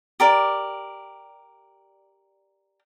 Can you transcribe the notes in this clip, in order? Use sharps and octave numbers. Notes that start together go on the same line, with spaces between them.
G4 A#4 D5